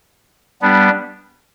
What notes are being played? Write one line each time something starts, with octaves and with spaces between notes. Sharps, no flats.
G3 B3 D4